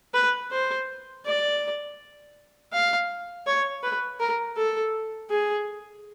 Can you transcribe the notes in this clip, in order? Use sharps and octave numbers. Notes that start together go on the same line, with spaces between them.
B4
C5
D5
F5
C#5
B4
A#4
A4
G#4